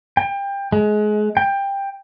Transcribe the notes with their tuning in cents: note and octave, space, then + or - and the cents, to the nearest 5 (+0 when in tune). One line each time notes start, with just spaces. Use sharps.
G5 +25
G#3 +25
G5 +15